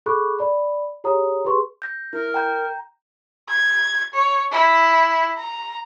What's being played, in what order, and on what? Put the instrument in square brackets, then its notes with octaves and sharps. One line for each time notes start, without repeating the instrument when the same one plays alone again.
[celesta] G#4 A4 B5 C#6 D6 F#6
D5 B5
G4 G#4 C#5 A#5 D#6
G4 G#4 B4 C6 C#6
[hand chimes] G6 A#6
[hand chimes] E4 [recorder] A#4
[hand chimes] G5 A#5 G6
[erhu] G#6
C#5
E4
A#5